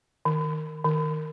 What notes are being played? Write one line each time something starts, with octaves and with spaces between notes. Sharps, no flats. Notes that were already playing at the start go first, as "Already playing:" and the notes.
D#3
D#3